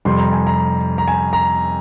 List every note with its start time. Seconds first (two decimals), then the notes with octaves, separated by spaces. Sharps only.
0.05 F2 C3 G3 C6
0.18 A#5
0.33 G#5
0.47 A#5
0.98 A#5
1.08 G#5
1.33 A#5